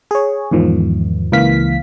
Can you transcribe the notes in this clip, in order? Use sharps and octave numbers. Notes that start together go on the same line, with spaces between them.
G#4 C#5
E2 G#2 D#3 F3
C#2 E3 A#3 F5 B6